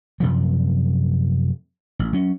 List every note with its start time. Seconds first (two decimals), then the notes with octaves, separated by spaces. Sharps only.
0.20 F#2 C3 F3
1.99 A1
2.13 F#3 C#4